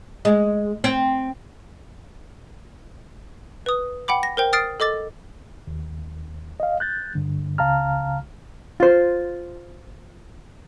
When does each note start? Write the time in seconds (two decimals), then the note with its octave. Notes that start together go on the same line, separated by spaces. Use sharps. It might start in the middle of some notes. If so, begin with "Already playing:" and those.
0.25 G#3
0.84 C4
3.66 B4 D#6
4.08 F#5 G5 B5 D6
4.23 A#6
4.37 A#4 C5 G5
4.53 D#6 F6 A6 C7 D7
4.80 A4 D#5 D6 A6
5.67 D#2
6.60 D#5 F5
6.80 F#6 G6 A6
7.15 G2 D3
7.58 C#2 C#3 F5 A5 A#5 F6
8.80 F4 C5